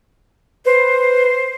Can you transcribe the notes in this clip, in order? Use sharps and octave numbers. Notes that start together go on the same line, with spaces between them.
B4 C5